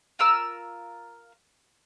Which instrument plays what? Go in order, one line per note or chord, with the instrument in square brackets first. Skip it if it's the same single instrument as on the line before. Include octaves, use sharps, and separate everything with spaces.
[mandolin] F4 A#4 E6